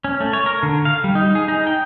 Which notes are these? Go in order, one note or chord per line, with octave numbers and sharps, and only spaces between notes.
C#4
A3
C#5
A#4
D3
F5
G3
D#4
G#4
D#4
G5